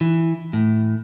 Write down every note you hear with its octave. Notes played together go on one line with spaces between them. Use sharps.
E3
A2